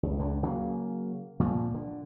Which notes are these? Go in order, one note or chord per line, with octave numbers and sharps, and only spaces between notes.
C#2
C#2 D3
C#3 F#3 A#3
A#2 F3
D3